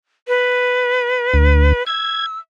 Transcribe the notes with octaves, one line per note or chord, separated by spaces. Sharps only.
B4
D2
E6 G#6